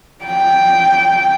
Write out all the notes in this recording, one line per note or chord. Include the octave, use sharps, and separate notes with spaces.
G5